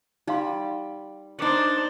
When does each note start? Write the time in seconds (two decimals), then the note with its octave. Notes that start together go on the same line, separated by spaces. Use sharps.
0.27 G3 D#4 F5 C6
1.39 D4 D#4 C5 D5